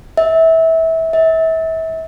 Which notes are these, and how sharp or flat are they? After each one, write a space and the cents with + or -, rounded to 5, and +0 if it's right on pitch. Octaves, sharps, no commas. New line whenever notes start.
E5 -20
E5 -30